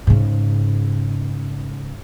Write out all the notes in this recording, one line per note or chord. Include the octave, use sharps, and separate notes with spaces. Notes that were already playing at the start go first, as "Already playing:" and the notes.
G#2 C#3